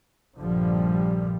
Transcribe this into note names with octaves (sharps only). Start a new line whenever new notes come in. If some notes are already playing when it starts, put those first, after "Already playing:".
A#1 G2 A#2 D3 F3 G3